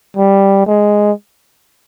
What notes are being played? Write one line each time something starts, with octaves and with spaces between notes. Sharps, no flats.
G3
G#3